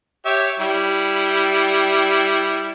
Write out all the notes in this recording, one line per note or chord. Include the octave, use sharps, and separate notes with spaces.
G4 C#5 E5
G3 E4